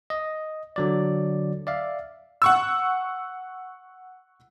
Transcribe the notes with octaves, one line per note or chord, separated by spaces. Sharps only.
D#5
D3 F#3 D5
D5 E5 F5
F#5 C#6 E6